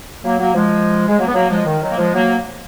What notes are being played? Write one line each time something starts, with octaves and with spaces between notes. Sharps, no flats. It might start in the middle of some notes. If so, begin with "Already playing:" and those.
F#3 A#3
F#3 A#3
F3 G#3
G#3
F#3 A#3
B3
F#3 A#3
F3 G#3
D#3
D#3 F#3
A#3
F3 G#3
F#3 A#3